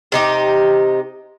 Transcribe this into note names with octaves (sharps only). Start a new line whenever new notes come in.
C3 D#4 G4